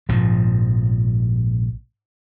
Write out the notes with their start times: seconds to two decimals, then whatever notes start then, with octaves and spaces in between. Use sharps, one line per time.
0.09 A#1 G#2 C3 F3